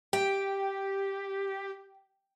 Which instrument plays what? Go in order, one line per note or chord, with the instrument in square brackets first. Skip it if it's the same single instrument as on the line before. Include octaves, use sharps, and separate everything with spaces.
[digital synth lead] G4 [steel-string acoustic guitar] G5